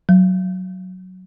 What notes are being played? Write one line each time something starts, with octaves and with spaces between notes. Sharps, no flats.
F#3